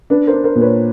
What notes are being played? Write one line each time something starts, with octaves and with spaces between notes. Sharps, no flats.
D4 B4
A#4 C5
D4
A#4 C5
A#2
B4 C#5